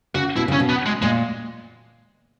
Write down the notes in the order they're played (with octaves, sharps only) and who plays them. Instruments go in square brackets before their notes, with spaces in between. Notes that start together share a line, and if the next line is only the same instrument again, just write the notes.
[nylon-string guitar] C#3 [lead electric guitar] F#4
[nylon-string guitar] B2 [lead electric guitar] E4
[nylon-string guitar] C#3 [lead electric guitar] C#4
[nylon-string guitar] B2
[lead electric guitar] B3
G#3
[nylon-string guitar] A#2 [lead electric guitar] G#3